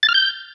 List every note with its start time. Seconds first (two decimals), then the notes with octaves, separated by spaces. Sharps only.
0.03 A6
0.09 F6
0.14 G6